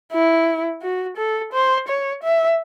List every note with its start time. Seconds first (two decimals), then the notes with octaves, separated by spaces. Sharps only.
0.12 E4
0.82 F#4
1.17 A4
1.53 C5
1.88 C#5
2.23 E5